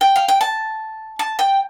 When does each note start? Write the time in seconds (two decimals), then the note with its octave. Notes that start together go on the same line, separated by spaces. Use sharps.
0.01 G5
0.16 F5
0.28 G5
0.41 A5
1.19 A5
1.39 G5